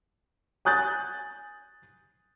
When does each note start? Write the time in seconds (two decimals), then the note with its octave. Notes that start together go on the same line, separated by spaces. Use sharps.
0.65 G#5 D#6 F#6 G6 A6